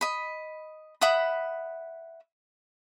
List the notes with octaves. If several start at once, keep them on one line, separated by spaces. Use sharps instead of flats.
D#5 B5
E5 F#5 B5 D#6